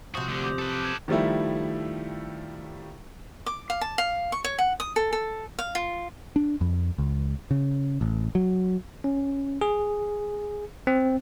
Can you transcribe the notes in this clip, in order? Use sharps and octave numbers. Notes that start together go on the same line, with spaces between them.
C3 F3 F#4 D#6 G6
D2 D3
D6 G6
A4 B4
D7
F#6 G#6 E7
D#3 F3 G3 A3 E4
D6
F5
A5
F5
C#6
C#5
F#5
D#6
A4
A4
F5
F4
D4
F2
C#2
C#3
A1
F#3
C#4
G#4
C4